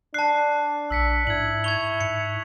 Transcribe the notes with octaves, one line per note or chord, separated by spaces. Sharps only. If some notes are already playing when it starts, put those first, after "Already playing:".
D4 A5 F#6 C7
A#1 E6 B6 C#7
G#2 E4 G#6 F#7
C#6 G#6 F7 G7
G#2 C#7